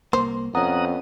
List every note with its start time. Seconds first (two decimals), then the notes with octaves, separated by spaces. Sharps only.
0.13 C2 G2 A#3 C5
0.55 F2 B3 C#4 F#5 A#5 D#6